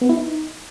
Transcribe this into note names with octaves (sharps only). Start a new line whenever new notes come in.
B3
E4
D#4